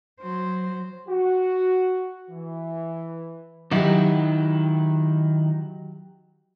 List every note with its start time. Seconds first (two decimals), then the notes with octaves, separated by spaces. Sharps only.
0.21 F#3 C5
1.07 F#4
2.30 E3
3.71 D#3 F#3 D#4 E4 G4